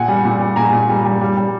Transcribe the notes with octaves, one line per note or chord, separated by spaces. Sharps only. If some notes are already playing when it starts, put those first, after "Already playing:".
Already playing: A#2 F#5 G#5
G3
A#2
G3
A#2 G#5 A#5
A#2
G3
G3
G3
G3